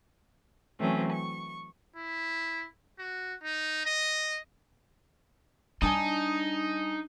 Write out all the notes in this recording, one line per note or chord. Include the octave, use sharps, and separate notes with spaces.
E3 F#3 A3 C4 C#4
C#6
E4
F#4
D#4
D#5
G3 D4 D#4 G#5 A5 D#6